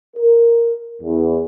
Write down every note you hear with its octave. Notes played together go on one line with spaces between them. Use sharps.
A#4
E2